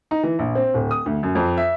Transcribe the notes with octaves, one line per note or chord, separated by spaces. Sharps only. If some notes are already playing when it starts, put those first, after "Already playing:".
D#4
E3
A#1
C4
D1
D#6
D2
F#2
F2
E5